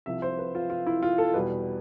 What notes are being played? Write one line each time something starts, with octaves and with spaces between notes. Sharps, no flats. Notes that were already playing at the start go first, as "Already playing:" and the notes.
C2 C3 F3 E5
C5
B4
F4
F4
E4
F4
A4
E2 B2 G3 B4